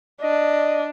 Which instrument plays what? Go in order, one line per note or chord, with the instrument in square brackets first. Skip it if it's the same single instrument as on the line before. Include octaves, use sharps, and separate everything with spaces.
[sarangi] D4 [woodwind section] D#5